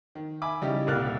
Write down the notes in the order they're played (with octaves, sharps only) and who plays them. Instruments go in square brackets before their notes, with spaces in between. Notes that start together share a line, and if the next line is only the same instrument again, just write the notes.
[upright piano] D#3
E5 G#5 B5 D6
C#3 G3 D#4 E4 G4
D#1 C2 A#3 F6 F#6 A6